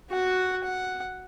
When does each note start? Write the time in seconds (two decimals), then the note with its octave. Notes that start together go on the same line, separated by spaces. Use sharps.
0.11 F#4 F#5
0.64 F#5